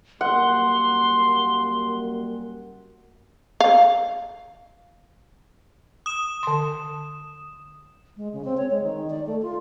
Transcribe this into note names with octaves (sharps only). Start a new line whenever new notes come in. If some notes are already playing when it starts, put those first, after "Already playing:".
F#2 G3 A#3 F#5 C6
F5
D#6 E7
D3 C6
G#3
C#3
C4
C#5
G#3
D#3
D5
A3
F4